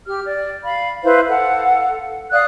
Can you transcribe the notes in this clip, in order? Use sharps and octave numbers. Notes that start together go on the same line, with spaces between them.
G4 F6
D5
F5 B5
E4 B4 C5 F5
A4 F5 F#5
D5 F5 D#6 F#6